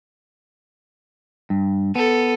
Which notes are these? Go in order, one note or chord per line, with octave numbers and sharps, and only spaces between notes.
G2
B3 A4